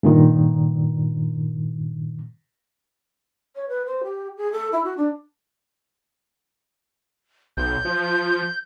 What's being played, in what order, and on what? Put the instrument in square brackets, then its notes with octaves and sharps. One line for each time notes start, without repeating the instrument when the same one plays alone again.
[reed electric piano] G2 A#2 D#3
[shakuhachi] C#5
B4
C5
G4
G#4
A4
E4
F#4
D4
[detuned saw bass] B1 [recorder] G6
[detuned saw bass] F3